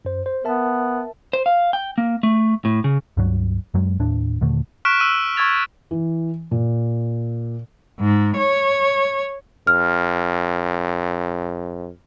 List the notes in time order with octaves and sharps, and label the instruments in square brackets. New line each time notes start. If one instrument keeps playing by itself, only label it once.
[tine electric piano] F#2 C5
C5
[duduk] B3 [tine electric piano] A#4 E5 A5
[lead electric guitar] C5
F5
G5
A#3
A3
A2
C#3
[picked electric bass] C#2 G2 F#3
F#2 F#3 G#3
D#2 A2 D4
D#2 A#2 D3 A3
[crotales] C#6 F6 F#6 B6 D7 E7
E6 D#7
C#6 E6 G#6 A6 F7
[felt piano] E3
A#2
[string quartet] G#2
C#5
[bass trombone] F2 [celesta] F6